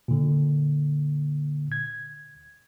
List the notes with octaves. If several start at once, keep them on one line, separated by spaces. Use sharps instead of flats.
A#2 D3
G#6